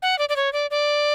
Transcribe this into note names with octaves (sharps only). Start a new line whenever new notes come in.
F#5
D5
D5
C#5
D5
D5